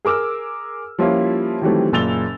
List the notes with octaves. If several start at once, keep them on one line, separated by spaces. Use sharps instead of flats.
G#4 A#4 D6 E6 F6
F3 G3 A#3 C#4 E4 F4
D#3 E3 F#3 G3 A3 C4
F#1 A#2 E6 A6 F7 G7